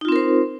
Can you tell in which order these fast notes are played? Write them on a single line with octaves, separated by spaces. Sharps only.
D#4 F4 C4 A#4 C5